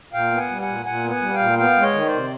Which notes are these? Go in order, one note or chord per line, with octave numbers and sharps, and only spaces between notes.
A#2 F5 G5
B3
F#5 G#5
G3
F#5 G#5
A#2
A#2 F#5 G#5
B3
F#5 G#5
G3
F5 G5
A#2
B3 F5 G5
G#3
C#5 D#5
D#3
C5 D5
C3